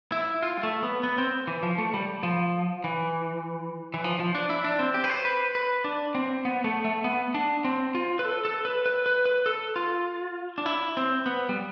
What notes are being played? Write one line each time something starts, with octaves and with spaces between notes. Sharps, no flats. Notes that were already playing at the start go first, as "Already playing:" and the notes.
E4
F4
G3
A3
B3
B3
C4
E3
F3
A3
G3
F3
E3
E3
F3
F3
D4
E4
D4
C4
G4
B4
C5
B4
B4
D4
C4
B3
A3
A3
B3
D4
C4
F4
B4
A4
A4
B4
B4
B4
B4
A4
F4
D4
E4
C4
B3
G3